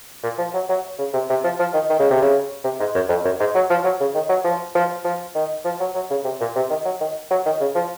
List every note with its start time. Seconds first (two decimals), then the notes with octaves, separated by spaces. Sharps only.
0.23 A#2
0.38 F3
0.54 F#3
0.69 F#3
0.99 C#3
1.13 C3
1.30 C3
1.44 F3
1.59 F3
1.74 D#3
1.90 D#3
1.99 C#3
2.10 C3
2.21 C#3
2.64 C3
2.80 G#2
2.95 F#2
3.09 F2
3.25 F#2
3.40 G#2
3.55 F#3
3.70 F3
3.84 F#3
4.00 C#3
4.14 D#3
4.29 F#3
4.44 F3
4.75 F3
5.05 F3
5.35 D#3
5.65 F3
5.80 F#3
5.95 F#3
6.10 C#3
6.24 C3
6.40 A#2
6.56 C3
6.70 D#3
6.85 F#3
7.01 D#3
7.30 F#3
7.46 D#3
7.61 C#3
7.75 F3